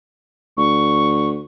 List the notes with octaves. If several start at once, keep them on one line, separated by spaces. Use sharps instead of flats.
D2 C#6